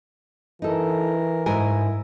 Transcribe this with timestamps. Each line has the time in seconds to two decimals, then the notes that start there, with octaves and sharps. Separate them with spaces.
0.62 E3 D#4 A4 A#4
1.46 G#2 E4 A#4 G#5